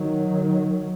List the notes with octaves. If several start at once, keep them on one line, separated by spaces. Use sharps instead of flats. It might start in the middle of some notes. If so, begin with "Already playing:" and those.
Already playing: D#3 F#3